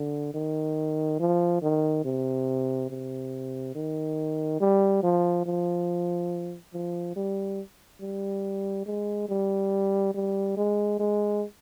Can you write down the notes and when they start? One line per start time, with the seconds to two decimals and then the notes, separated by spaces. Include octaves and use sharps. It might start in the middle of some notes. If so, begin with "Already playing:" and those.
Already playing: D3
0.34 D#3
1.19 F3
1.62 D#3
2.05 C3
2.90 C3
3.75 D#3
4.61 G3
5.03 F3
5.46 F3
6.74 F3
7.16 G3
8.01 G3
8.86 G#3
9.29 G3
10.14 G3
10.57 G#3
10.99 G#3